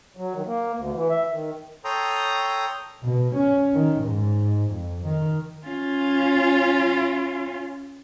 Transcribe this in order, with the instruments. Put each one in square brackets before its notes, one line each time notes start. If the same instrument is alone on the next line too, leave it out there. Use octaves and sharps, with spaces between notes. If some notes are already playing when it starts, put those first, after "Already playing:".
[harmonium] F#3
D#3
A#3
D2
E3
E5
D#3
[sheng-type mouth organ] A4 C#5 G5 A#5 C6 D#6
[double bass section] B2
C#4
D#3
G#2
F2
D#3
[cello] C#4 F4